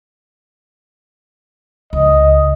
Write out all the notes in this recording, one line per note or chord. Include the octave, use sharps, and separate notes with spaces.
C#2 D#5